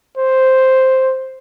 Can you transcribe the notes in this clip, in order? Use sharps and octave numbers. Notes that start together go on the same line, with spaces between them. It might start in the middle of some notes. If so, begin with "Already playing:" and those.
C5